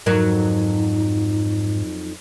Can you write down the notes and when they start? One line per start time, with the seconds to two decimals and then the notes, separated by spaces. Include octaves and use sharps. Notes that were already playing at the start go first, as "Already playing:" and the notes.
0.06 F2 G#2 F#3 D#4 A#4